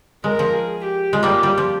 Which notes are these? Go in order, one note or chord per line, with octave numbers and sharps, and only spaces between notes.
G#3 A#4
F3
G#4
G4
G#3 F4
G3 A#3
G3 G4
F3